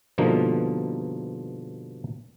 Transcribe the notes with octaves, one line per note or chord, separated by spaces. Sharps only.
G2 B2 D3 F3 A#3 D#4